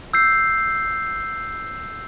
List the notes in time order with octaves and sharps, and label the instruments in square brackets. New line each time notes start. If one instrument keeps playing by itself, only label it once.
[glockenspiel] E6 G6 C7